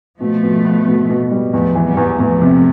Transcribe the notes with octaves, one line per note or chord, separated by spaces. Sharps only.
B2 F3 A3
B2
B3
B2
B2
G3
E2 F3 A3
E3
G3 B3
E2
E2 F3 A3
C3